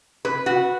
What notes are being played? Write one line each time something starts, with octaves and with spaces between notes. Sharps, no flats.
B4
F#4